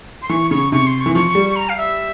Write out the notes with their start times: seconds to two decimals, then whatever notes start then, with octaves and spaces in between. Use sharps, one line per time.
0.22 C6
0.29 E3 C#6
0.51 C#3 C#6
0.72 C3 C#6
0.87 C6
1.01 C#6
1.06 E3
1.15 F3 C#6
1.35 G3
1.56 A#5
1.69 F5
1.78 E5